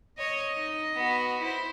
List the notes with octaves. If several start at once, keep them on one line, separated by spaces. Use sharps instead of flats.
C#5 D#5
D#4
B3 F#4
E4 C5